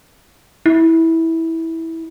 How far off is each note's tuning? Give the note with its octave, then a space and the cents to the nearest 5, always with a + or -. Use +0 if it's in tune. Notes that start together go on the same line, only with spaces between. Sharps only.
E4 -15